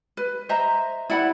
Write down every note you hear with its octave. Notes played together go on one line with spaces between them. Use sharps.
B4
C5 D#5 E5 A#5
E4 D5 F#5 B5